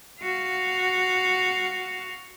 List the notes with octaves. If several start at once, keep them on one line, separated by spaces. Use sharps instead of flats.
F#4 F5